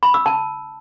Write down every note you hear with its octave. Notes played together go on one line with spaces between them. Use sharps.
B5
E6
A5